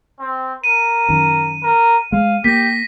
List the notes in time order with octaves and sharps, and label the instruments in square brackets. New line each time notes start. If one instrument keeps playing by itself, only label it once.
[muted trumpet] C4
[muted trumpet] A#4 [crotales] D#7
[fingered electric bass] F#2 D#3
[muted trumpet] A#4
[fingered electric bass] G#3 [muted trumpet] F5
[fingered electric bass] A#3 [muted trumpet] G4 [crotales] A#6 B6